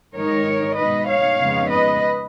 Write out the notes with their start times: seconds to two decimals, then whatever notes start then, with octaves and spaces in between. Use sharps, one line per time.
0.15 G#2 D#3 G#3 D#4 A#4 C#5
0.76 B2 G#3 D#4 B4 D#5
1.08 C#5 F5
1.39 F2 C#3 G#3 B3 D#4
1.69 B4 D#5